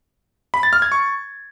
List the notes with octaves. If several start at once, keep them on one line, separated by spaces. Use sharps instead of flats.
B5
A6
F6
G#6
C#6